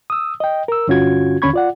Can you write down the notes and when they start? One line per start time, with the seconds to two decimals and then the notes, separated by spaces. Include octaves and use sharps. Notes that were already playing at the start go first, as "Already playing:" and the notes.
0.10 D#6 E6
0.40 D#5 G5
0.68 A#4 E6
0.88 G2 D3 C#4 F4 F#4 G#6
1.42 D#2 D3 C#4 B5 C#6 G#6
1.54 F4 D5 F#5